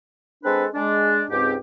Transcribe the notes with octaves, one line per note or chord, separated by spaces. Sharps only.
G#3 C4 D4 A4 B4
G#3 D4
C#2 G#2 C4 G4